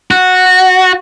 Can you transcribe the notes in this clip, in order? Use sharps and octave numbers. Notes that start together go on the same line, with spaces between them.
F#4